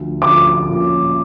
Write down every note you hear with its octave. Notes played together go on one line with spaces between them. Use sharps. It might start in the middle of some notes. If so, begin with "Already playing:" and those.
Already playing: D2 D3 F3
D2 D3 F3 D6
A#2 F3 C#4